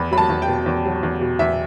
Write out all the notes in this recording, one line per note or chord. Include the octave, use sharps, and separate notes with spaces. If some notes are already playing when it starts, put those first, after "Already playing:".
Already playing: E2 B5
F#3 B5
A5
E2
G5
B2
E2
F#3
E2
B2
E2 E5